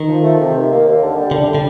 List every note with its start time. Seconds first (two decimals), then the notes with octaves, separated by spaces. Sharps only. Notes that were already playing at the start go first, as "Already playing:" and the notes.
Already playing: D#3
0.09 F3
0.23 A3
0.39 C3
0.55 D#3
0.70 A#3
0.85 D#2
1.01 D3
1.16 G3
1.31 A2 D3
1.47 G3
1.55 D3